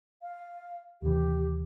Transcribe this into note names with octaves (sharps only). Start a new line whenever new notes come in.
F5
D#2 C3 E3 G4